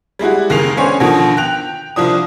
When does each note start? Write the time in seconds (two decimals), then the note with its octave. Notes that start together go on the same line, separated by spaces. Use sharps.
0.19 G3 G#3 E4 F#4
0.50 F#1 D#2 D#3 G#3 C7 F7
0.77 B3 C#4 D4 C5 C#5 G#5
1.00 B2 D3 D#3 F3
1.37 G5 F#6 F7
1.96 C2 F3 D4 D#6